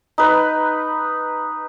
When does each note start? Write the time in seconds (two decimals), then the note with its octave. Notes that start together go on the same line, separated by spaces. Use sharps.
0.18 D#4 B4